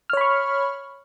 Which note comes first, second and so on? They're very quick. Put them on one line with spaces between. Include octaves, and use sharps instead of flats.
F6 C#5 B5 C#6